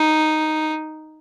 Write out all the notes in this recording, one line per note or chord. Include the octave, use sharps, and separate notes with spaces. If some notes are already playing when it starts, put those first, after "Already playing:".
Already playing: D#4